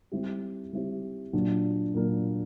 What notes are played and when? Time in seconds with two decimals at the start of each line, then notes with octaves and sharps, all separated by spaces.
0.12 G3 C4 E4 G4
0.73 G3 C4 E4 G4
1.33 A#2 F#3 A#3 D4
1.94 A#2 F#3 A#3 D4